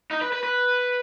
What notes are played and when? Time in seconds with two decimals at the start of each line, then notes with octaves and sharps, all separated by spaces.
0.11 D#4
0.21 B4
0.32 B4
0.43 B4